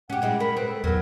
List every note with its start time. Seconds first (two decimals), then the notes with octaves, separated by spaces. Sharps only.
0.10 C#4 G4 F#5
0.22 G3 G#3 E4
0.40 A#4 B5
0.57 C4 B4
0.68 A4
0.84 E2 E3 F#3 A#4